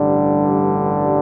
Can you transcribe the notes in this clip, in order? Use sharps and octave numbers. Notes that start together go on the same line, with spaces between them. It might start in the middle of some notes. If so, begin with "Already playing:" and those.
Already playing: A1 G2 D3 G3